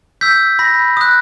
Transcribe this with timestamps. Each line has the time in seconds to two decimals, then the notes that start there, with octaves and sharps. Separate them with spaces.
0.21 E6 G6 B6
0.59 B5 A#6
0.97 D#6 F#6